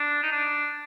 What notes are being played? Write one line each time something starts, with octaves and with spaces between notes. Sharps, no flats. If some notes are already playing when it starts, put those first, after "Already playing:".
Already playing: D4
D#4
D4